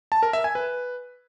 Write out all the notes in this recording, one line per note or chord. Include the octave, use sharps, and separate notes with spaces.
A5
A#4
E5
G#5
B4